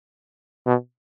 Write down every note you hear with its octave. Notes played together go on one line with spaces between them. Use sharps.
B2